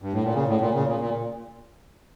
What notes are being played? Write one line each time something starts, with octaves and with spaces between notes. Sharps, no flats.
G2
A2
A#2
C#3
A2
A#2
C#3
A#2
A#2